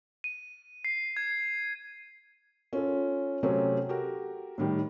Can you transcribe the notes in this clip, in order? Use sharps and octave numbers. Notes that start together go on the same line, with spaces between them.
D#7
C7
G#6
C#4 F4 A4
C3 F#3 A3 C4 C#4
F#4 G4 A4 A#4
A2 D#3 G3